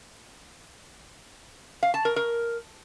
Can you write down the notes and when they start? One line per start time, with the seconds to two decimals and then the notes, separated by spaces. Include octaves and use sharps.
1.83 F5
1.94 A5
2.05 A#4
2.16 A#4